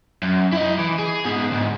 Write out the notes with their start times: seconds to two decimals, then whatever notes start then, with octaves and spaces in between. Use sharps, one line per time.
0.23 F#2
0.52 E4 D#5
0.78 E3
0.99 G#4
1.24 G#2 B3
1.51 D2 G#2